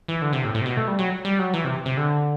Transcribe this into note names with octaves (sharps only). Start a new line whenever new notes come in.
E3
D3
C3
A2
A2
C3
B2
A3
G3
F#3
G3
F#3
E3
C3
C3
D3